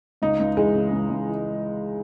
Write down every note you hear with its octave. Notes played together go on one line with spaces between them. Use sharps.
C#2 D#4
C#2
E3 G#3
C#3
C#2
C#2
E3